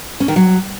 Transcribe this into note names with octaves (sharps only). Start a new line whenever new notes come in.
C#4
D#3
F#3